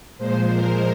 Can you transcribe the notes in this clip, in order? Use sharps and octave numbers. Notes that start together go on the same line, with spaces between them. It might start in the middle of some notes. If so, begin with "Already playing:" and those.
A#2 F3 G#3 C5
A#4